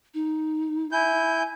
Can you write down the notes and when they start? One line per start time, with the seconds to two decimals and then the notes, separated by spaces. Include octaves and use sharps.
0.14 D#4
0.92 E4 G#5 G6